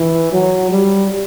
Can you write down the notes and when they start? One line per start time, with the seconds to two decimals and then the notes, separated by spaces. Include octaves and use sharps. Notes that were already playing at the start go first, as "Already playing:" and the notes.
Already playing: E3
0.32 F#3
0.71 G3